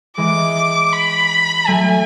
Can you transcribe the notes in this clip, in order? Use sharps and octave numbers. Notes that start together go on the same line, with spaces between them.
E3 G#3 D6
B5
F#3 A3 G#5